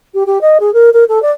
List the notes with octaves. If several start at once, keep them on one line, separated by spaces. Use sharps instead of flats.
G4
G4
D#5
G#4
A#4
A#4
A4
D5